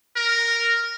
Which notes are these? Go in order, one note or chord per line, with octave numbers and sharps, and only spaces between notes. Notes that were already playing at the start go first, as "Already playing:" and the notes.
A#4